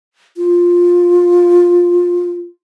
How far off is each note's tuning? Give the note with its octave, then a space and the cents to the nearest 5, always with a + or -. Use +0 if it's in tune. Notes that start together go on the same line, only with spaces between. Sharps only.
F4 +10